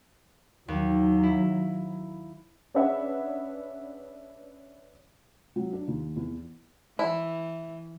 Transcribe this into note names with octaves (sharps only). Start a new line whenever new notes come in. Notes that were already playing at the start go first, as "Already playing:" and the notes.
D#2 F#3
E4
C#4 D4 G#4 B4 E5 F#5
F#3
D4
D#2
E2
E3 E4